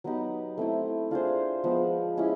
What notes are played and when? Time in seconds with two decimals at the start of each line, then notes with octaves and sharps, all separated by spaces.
0.04 F#3 B3 D#4 G4
0.57 A3 C4 E4
1.11 D4 F4 G#4 C5
1.64 F3 G#3 B3
2.17 G#3 C#4 E4 G4